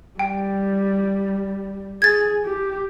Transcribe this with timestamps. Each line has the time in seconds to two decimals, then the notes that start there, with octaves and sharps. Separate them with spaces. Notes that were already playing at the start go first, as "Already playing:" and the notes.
0.19 G3 G5
2.02 G#4 G#6 A6
2.45 G4